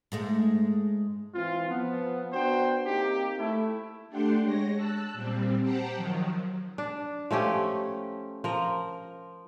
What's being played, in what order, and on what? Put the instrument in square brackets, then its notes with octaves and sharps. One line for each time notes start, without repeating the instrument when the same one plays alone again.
[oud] G#2 G#3 A3
[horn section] E3 C4 F4
F3 B3
B3 D4 F#4 C5 G5
A#3 C4 D#4 G4
A3 E4
[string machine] A3 D4 G4 F#5 G5 C6
G#3 C#5 A#6
A5 E6 F#6
A#2 G3 C4
G4 C5 F#5 G5 A5 A#5
D#3 F3 F#3
[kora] D4
F3 A3 C#4 G4
F3 A#4